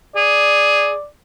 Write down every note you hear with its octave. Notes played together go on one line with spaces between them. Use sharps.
G#4 D5